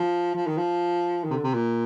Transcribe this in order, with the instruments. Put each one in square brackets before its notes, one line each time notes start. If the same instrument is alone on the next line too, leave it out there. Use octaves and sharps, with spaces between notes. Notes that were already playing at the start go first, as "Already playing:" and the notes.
Already playing: [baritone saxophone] F3
F3
D#3
F3
D#3
C3
D3
C3
A#2